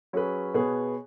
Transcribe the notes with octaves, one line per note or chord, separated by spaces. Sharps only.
F#3 C#4 G#4 B4
B2 B3 G#4 C#5